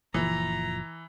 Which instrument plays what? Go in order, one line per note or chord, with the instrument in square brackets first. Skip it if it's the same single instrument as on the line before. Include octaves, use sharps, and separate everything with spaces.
[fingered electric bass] F#1 A#2 F3 [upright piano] E3 [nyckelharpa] A#5